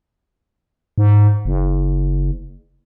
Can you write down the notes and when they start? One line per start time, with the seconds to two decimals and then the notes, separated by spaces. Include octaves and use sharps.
0.98 G#2
1.45 F#1